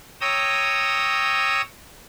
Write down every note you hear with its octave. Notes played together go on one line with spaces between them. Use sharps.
C#5 G5 A#5 D#6 E6